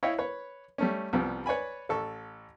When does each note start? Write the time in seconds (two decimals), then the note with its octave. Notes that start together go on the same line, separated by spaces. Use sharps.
0.03 E4 C#5 D#5 F5 G5
0.18 B4 C#5
0.78 G3 A3 C#4
1.13 C2 F3 G3 B3
1.46 B4 C#5 D5 G#5 B5
1.89 A1 A4 C#6